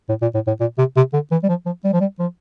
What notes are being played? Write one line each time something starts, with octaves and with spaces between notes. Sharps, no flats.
A2
A#2
A2
A2
A#2
C3
C3
D3
E3
G3
F3
F3
G3
F3
G3
F3